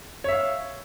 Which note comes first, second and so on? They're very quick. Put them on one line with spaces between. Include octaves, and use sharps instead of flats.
C#5 E5 F5